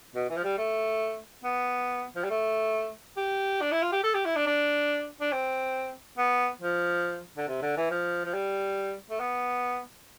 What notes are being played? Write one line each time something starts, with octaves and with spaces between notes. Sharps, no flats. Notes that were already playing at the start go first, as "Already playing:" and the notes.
B2
E3
F3
G3
A3
B3
F3
G3
A3
G4
D4
E4
F4
G4
A4
G4
E4
D4
D4
D4
C4
B3
F3
D3
C3
D3
E3
F3
F3
G3
A3
B3